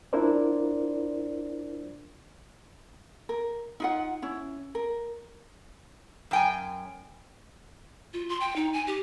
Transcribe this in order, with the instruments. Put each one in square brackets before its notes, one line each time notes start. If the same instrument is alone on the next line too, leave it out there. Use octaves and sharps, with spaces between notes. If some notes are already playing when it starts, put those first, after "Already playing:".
[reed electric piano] D4 E4 F4 A#4 C5 D5
[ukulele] A#4
D#4 F4 F#5
C#4 E4
A#4
[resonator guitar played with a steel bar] F#2 G5 G#5
[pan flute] F4
C6
G5
D#4
G#5
G4